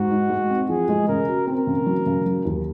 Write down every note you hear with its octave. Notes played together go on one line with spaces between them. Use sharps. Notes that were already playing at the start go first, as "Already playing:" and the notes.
Already playing: G#2 F#4
D#4
G#3
C4
F3 G#4
G#3
C#3 A#4
F#4
C4 A#4
C#3
F#3
C#3
F#3
D#2